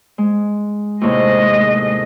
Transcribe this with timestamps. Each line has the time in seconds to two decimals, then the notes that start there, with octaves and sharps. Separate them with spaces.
0.18 G#3
1.01 D#2 A2 C3 G#3 D#5